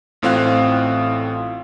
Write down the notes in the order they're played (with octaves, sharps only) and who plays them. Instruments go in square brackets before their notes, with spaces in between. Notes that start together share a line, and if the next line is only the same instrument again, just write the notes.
[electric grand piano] A1 A2 C4 F4 F5 F#6